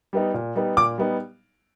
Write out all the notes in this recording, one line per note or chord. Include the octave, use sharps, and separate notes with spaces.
G3 B3 D#4
A#2
G3 B3 D#4
A#2 D6
G3 B3 D#4